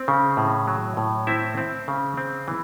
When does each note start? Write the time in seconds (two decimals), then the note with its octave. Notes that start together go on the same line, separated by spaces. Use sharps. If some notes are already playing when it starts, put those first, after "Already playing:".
Already playing: C4
0.08 C#3
0.37 A2
0.68 F#3
0.97 A2
1.27 C4 E4 E5
1.57 C4
1.88 C#3
2.17 C4
2.48 E3